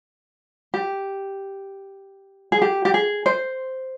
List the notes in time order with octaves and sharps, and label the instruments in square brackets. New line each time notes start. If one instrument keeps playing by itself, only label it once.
[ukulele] G4
G#4
G4
G4
G#4
C5